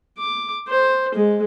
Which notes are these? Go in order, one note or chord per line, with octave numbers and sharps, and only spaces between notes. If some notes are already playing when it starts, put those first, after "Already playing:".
D6
C5
G#3